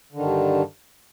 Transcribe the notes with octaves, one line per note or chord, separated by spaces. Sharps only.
G2 D3 D#3